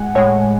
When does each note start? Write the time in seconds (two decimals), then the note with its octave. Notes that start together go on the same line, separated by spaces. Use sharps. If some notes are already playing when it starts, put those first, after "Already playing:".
Already playing: A2 G#3 F#5 G#5
0.15 A2 G#3 C#5